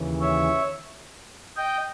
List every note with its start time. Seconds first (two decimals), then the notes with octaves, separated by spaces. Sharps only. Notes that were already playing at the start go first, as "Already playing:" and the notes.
Already playing: D#2 C#3 E3
0.21 C#5 E5
1.57 D#5 G5